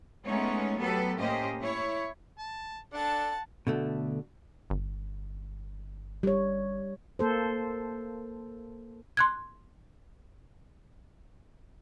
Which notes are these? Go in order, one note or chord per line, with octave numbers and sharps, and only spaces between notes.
G#3 A3 B3 C#4 D#4 C#5
F#3 B3 G4 A4 B4
A2 A#3 C#4 G4 C5 D#5
E4 C#5
A5
D4 A4 F#5 A5
B2 D3 A3
G1
G3 C#5
A#3 A4 C5
C6 F#6 G#6